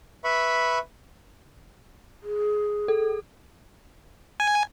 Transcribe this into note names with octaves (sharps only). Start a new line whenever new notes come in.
B4 E5 B5 C#6
G#4
A4
G#5